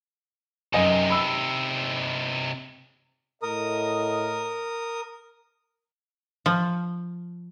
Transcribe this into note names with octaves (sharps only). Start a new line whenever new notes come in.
F#2 C3 D#4 D#5 G#5
B5 E6
A2 A#4 D#5 D#6
F3